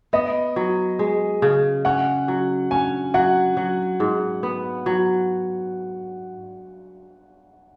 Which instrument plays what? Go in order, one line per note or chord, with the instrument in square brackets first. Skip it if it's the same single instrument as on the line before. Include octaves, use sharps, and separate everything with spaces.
[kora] B3 [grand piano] D#5
[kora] F#3
G#3
C#3
[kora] C#4 [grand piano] F#5
[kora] F#3
[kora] C#4 [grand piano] G#5
[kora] F#3 [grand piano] F#5
[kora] F#3
G#2
B3
F#3